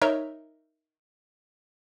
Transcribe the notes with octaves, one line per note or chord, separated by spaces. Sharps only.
D#4 A#4 C#5 D#5 E5